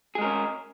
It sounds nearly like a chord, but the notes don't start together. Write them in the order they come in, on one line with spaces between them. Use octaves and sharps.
G#4 G#3 A#4 C#4